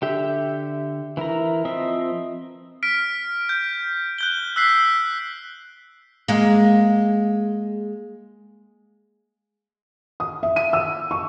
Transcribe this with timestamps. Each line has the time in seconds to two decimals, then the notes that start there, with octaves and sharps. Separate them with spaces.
0.02 D3 G4 E5
1.17 E3 E4 A#4 A#5
1.65 F3 C4 D#5 E5
2.83 F6 B6 D7
3.49 G6
4.18 F#6 G6 G7
4.56 E6 F#6 B6 C7
6.28 G#3 A#3
10.20 D#6
10.43 E5
10.56 D#7
10.73 E6
11.11 C#6